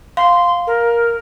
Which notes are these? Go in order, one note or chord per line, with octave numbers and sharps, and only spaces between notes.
F5 C6
A#4